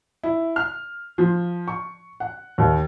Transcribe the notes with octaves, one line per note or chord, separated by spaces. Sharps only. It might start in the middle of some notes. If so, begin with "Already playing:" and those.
E4
F6
F3
C#6
F#5
D#2